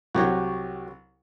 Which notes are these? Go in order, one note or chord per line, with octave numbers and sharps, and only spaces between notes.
C2 F#3 F#4 G4 C#5